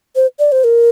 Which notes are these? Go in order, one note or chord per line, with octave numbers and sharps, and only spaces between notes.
C5
D5
C5
A#4